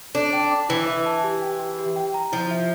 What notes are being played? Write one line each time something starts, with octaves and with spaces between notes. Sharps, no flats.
D4 A4
G5
D6
E3 E4
E5
A5
G4
G5
G4
G4
G5
A#5
F3 E4
E5